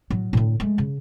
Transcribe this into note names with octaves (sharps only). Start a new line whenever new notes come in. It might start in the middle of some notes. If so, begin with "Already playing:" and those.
A2 F#3
A2 D3
G#3 A3
C#3